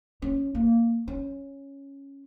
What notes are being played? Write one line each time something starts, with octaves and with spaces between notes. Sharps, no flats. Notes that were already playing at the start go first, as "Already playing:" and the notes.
C#4
A#3
C#4